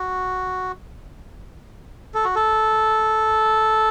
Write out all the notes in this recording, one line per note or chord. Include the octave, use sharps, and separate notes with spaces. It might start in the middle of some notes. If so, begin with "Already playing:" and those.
Already playing: F#4
A4
F#4
A4